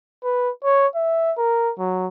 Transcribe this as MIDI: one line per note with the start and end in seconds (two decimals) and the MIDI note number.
0.24 0.51 71
0.64 0.87 73
0.95 1.33 76
1.38 1.72 70
1.78 2.08 54